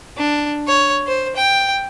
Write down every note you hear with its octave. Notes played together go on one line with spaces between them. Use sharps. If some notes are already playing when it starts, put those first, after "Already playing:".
D4
C#5
C5
G5